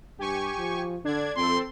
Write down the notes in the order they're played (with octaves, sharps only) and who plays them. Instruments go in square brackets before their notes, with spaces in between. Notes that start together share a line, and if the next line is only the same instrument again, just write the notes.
[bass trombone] G2 [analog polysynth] G4 G#5 C#6
[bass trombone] F3
[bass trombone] D3 [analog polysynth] D4 G#6
[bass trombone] F2 [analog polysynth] C4 A4 [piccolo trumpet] C6